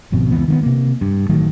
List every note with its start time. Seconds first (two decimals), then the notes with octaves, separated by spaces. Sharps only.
0.12 G#1 F2 B2
0.31 C#2 E3 B3
0.48 D#3 A3 B3
0.63 C3 A#3
1.01 G2
1.29 A1 D#3 F#3 A3